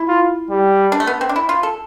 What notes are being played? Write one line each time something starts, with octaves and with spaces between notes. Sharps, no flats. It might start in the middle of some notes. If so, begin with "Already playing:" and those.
Already playing: E4
F4
G3
D4
A3
B3
C4
D4
E4
F4
A4